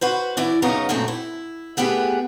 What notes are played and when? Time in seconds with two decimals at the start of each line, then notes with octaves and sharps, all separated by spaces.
0.01 F#4 B4 C5
0.37 E3 E4 D5
0.62 F#2 C#3 B3 D#4 A#5
0.89 F#2 A#2 A3 C4
1.08 E4
1.77 A3 B3 G4 G#4 B4